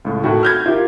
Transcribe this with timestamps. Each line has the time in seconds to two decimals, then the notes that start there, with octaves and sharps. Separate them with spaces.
0.05 C#2 A2
0.24 A2 D#3 F#4
0.43 F6 G6 G#6
0.66 E4 F4 G4 A#4